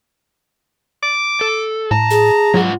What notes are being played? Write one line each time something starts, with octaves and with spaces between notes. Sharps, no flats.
D6
A4
A2 A5 A#5
G#4
G#2 F#3 F4 F#5